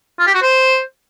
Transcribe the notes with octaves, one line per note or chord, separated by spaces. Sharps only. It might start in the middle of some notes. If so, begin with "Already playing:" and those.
F4
G4
F#4
C5